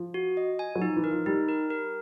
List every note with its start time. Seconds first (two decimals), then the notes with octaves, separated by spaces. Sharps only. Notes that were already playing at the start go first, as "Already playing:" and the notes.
Already playing: F3
0.14 F#4
0.37 D#5
0.59 G#5
0.76 F#3
0.82 F3 D#4
0.96 E3
1.04 A#4
1.11 F3
1.26 G3 D#4
1.48 A#4
1.70 A#4